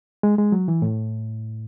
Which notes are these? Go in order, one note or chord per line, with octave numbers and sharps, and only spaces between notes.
G#3
G#3
F#3
E3
A2